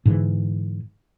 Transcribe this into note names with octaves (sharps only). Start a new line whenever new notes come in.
G#2 D3 E3